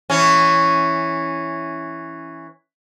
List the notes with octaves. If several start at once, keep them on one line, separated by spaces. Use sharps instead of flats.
E3 C#4